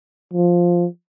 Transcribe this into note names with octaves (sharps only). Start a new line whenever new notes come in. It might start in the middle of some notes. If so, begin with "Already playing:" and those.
F3